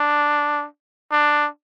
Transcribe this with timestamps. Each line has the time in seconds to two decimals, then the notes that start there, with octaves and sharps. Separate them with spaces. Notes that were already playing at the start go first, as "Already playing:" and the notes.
Already playing: D4
1.12 D4